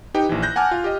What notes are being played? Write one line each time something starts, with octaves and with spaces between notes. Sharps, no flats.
D#4 G4 B4 G5
A#1 E3
F#6 G6 A#6
F#5 G#5 A5 D6 F6
F4
G4 D#5